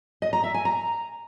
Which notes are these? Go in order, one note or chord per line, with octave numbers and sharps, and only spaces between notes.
D#5
A#5
E5
G#5
A#5